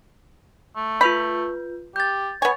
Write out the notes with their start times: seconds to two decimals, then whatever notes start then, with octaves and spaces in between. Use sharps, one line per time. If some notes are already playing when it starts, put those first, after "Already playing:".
0.76 A3
1.01 F4 B4 B5 G6
1.96 G4 G6 A6
2.42 B3 C#5 G#5